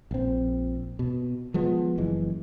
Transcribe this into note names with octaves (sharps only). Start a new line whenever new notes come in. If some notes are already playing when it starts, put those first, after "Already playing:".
A#1 C4
B2
F3 G#3 B3
F#1 E3 G#3